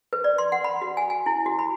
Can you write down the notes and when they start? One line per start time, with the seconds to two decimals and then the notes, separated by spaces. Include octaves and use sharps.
0.13 B4
0.24 D5
0.38 C6
0.52 F#5
0.64 B5
0.82 F#4
0.97 G#5
1.10 G#5
1.26 E4
1.46 F#4
1.59 B5